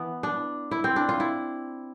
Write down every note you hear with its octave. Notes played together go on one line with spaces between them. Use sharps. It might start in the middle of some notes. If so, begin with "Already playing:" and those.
Already playing: E3 B3
D4
E4
C4
D4
F4
E4